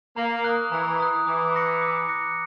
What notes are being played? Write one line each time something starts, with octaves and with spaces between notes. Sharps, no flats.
A#3 A#5
D#6 F#6
E3 A#5
D#6 F#6
E3 D6
F#6 A#6 C#7
D6
F#6 A#6 C#7